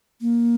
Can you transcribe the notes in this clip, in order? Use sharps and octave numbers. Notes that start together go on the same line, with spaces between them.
A#3